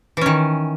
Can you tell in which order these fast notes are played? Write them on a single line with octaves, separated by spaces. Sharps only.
E3 C#4 D#3